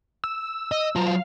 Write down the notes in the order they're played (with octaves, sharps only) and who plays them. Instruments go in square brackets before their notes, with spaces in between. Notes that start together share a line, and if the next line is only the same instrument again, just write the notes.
[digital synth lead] E6
[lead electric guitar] D#5
[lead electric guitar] F#3 F4 [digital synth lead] A#5
[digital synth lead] F5